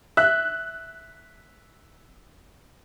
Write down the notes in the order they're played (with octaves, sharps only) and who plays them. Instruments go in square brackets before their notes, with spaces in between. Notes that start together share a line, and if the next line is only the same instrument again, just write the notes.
[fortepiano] E5 [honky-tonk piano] F#6